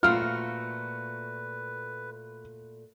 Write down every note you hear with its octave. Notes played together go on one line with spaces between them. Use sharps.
A#2 A3 F4 F#4 B4 F5 F6